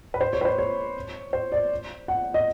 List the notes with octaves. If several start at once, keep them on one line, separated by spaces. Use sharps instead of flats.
B4
C5
C#5
B4
C5
C#5
C5
D5
F#5
D#5